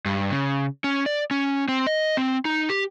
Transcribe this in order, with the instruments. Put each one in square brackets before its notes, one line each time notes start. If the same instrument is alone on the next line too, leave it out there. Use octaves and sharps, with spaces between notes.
[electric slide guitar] G2
C#3
C#4
D5
C#4
C4
D#5
C4
D#4
G4